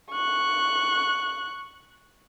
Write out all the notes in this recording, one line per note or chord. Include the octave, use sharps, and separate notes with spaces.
C#6 F#6